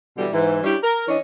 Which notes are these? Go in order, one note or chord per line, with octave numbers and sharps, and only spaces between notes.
B2 D3 E3 G3
G#2 E3
G3 C#4 D4 E4 G4
A#4
E3 C#4 D4 C#5 D#5